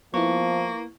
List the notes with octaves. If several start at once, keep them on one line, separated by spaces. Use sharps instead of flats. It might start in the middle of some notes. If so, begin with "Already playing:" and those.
F3 A#3 B3 E4 C#6